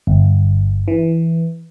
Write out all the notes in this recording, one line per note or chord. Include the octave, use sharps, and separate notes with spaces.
G1
E3